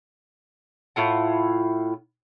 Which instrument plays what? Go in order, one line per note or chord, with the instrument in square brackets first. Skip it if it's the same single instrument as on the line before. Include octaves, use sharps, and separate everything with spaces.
[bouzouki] A2 E4 F4 F#5